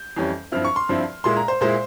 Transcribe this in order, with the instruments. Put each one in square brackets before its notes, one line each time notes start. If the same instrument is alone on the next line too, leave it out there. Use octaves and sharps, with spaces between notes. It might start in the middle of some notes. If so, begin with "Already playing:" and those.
Already playing: [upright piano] G6
F2 E3 G3 C#4
G2 F3 C4 E4 F6
C#6
C6
G2 F3 C4 E4
A#2 G#3 E4 C6
A#5
C5
A#2 G#3 E4 C5